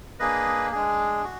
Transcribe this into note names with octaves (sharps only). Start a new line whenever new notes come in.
A#3 D4 G#4 B4 D#5
G#3 D4 G#4
F#4